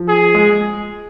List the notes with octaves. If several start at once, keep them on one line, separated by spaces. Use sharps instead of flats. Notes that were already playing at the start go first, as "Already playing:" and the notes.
Already playing: F3
G#4
G#3